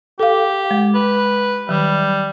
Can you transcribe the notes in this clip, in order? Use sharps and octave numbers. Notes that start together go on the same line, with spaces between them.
G4 A4 F5
G#3
B4
D#3 F#3 G3